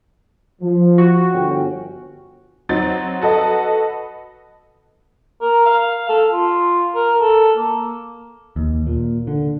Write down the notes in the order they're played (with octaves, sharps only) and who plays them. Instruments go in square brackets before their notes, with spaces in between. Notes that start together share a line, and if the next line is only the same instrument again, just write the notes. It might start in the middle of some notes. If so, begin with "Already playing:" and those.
[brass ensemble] F3
[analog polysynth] F#4
[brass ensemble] G1 C#4 G5
[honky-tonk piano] F#3 C4 D#4 A6
F#4 A4 B4 D#5
[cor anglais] A#4
F5
A4
F4
A#4
A4
A#3
[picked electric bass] D#2
A#2
D3